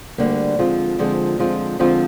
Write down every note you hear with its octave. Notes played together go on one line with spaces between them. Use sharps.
D2 D3 G3 A#3
D3 F3 G#3 C4 F4
D3 F3 G#3 C4 F4
D3 F3 G#3 C4 F4
D3 F3 G#3 C4 F4